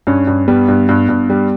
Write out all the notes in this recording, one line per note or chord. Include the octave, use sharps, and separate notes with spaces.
G2 C#4
G2
G3 B3
G2
G2
G2
G3